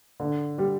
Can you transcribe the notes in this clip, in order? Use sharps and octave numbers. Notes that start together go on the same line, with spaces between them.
D3
G3